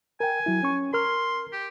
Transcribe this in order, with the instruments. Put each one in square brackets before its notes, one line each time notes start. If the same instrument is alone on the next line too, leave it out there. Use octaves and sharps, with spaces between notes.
[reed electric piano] A#4 G5 [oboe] G#5
[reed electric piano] F#3 E4
C#4 C#6
[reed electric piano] A#4 F6 [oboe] C6
[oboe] G4